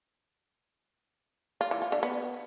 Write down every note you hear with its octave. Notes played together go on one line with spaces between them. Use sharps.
F4
E3
F4
D3
B3